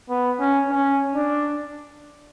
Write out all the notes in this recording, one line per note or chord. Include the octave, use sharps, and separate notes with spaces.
B3
C#4
C#4
D4